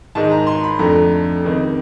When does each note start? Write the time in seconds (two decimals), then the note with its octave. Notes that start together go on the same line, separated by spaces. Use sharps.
0.15 G#2 D#3 G#3 A5
0.32 A#5
0.47 C6
0.63 B5
0.79 F2 D3 F3 A3 A#5
1.44 C#2 C3 D#3